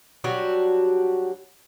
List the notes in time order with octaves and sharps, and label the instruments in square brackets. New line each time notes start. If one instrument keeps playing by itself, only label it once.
[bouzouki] F#3 G3 D4 F#4